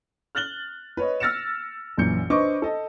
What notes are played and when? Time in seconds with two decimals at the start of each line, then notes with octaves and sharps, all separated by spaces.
0.35 F6 F#6 A6 F#7 G7
0.97 B4 C#5 D#5
1.20 E6 F6 A6 A#6 C#7 E7
1.98 A#1 F#2 E3 G6 C#7
2.30 D4 B4 C5 D#5 C#6 D6
2.62 A4 D#5